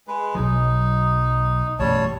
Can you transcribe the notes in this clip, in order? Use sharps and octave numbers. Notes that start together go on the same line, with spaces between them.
G#3 B4
B1 F#3 D#4
A1 F#2 B2 G3 C#5 A5